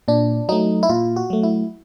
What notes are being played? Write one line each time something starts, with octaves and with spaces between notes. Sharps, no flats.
A#2 D4
F#3 A3 D#4
E4
A#2 F4
F#4
F#3 A3
E4